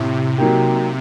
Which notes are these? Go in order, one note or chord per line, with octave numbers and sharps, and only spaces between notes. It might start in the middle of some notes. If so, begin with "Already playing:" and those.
Already playing: A2 C3
F#3 A#3 D#4 G4